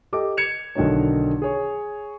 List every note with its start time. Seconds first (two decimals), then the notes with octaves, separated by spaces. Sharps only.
0.13 G4 A4 D#5 D6
0.37 G#6 C#7 E7 F7
0.75 B1 D3 D#3 D#4 C#5
1.42 G#4 C#5